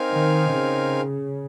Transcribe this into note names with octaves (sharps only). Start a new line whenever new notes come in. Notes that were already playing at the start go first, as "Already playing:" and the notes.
Already playing: C4 D#4 A#4 F5 G#5
D#3
C#3